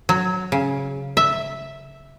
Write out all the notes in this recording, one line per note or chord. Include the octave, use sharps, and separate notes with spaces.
F#3
C#3
E5